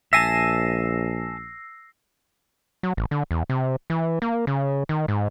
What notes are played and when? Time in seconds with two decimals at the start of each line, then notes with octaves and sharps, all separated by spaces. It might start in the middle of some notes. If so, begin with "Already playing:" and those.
0.13 A#1 E5 G#5 A5 E6 A#6 C7
2.83 F#3
2.97 A1
3.11 D3
3.31 E2
3.50 C3
3.90 E3
4.22 A#3
4.47 C#3
4.89 D#3
5.08 G#2